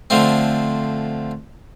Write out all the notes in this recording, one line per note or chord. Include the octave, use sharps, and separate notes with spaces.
D3 F3 A3 C4